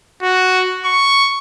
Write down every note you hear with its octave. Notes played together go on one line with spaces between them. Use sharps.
F#4
C#6